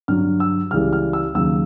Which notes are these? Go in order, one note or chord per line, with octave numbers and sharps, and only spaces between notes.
G2 D3 F#3 F6
E6
C#2 C#3 E3 G3 F6
F6
E6
D#2 C#3 F#3 E6